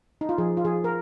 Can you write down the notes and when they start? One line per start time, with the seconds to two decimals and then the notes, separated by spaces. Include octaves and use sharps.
0.21 D#4
0.29 F4
0.38 F3 G#4
0.57 F4
0.65 F3 G#4
0.84 A#4